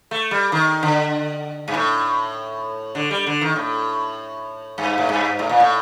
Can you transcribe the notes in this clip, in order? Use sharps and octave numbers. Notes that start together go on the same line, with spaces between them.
A3
G3
D#3
D3
G2
A2
D3
G3
D3
D#3
A2
G2
A2
G2
A2
A#2
A2